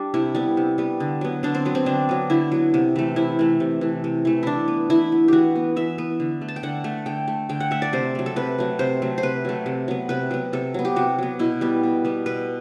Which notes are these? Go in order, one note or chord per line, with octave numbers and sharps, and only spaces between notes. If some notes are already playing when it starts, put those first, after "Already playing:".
Already playing: G3 D4 G4
C3 E4
G3 B3
C3
G3 B3
D3
F#3 B3
D3 D4
C4
F#3 B3
C4
D3 D4
F#3 B3
D3 E4
F#3 B3
C3
E3 A3
C3 E4
E3 A3
C3
E3 A3
C3
E3 A3
E3 D4 E4
B3
E3 E4
B3
E3 F#4 G4
B3
E3 E5
B3
D3
A3
A5
G5
D3 F#5
A3
D3 G5
A3
D3 G5
F#5
A3 E5
D5
C3 C5
F#3 A3
A4
C3 B4
F#3 A3
C3 C5
F#3 A3
C5
C3 B4
F#3 A3
C3
F#3 B3
C3 B4
F#3 B3
C3 A4
F#3 B3
G4
C3 F#4
F#3 B3
B2 E4
G3 B3
B2
G3 B3
B2 B4